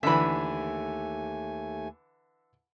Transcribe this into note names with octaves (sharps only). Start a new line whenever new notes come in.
D#2 D3 E3 A3 E5 G#5 B5